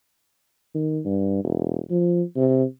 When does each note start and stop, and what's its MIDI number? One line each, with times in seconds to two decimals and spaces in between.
0.75 1.00 51
1.05 1.42 43
1.44 1.79 28
1.91 2.22 53
2.36 2.64 48